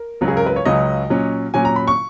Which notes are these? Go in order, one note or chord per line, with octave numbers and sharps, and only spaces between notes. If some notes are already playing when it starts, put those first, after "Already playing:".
Already playing: A#4
C#2 C#3 F#3 C#4
G#4
A#4
B4
C#5
C#2 C#3 F#3 C#4 D#5
A#2 F#3 C#4
A#2 F#3 C#4 G#5
A#5
B5
C#6